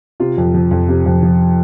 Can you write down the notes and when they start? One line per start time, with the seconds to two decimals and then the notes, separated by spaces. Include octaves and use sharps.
0.20 C3 F4
0.37 F2
0.54 F3
0.71 F2
0.89 C3
1.06 F2
1.23 F3